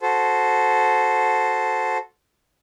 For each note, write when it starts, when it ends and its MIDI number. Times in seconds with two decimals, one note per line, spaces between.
0.01 1.98 66
0.01 1.98 69
0.01 1.98 72